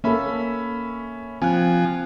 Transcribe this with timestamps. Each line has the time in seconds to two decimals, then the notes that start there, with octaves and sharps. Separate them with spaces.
0.04 A#3 C#4 A4 E5 B5
1.42 F3 C4 G#5 F#6